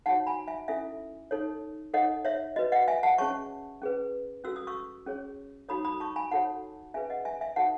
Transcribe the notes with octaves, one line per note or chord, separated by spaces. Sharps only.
D#4 F#4 C#5 F#5 A5
G#5 B5
E5 G#5
C#4 E4 A4 E5 G#5
D#4 A4 C#5
D#4 A4 C#5 D#5 F#5
C#5 E5
F#4 B4 D#5
D#5 F#5
E5 G#5
F#5 A5
C#4 G#4 C#5 A5 C#6
C#4 G#4 B4
C#4 F#4 A4 E6
D#6
C#6 E6
C#4 G#4 C#5
D#4 F#4 A4 C#5 B5 D#6
B5 D#6
A5 C#6
G#5 B5
D#4 F#4 A4 C#5 F#5 A5
C#4 G#4 B4 E5 G#5
D#5 F#5
E5 G#5
E5 G#5
D#4 F#4 A4 C#5 F#5 A5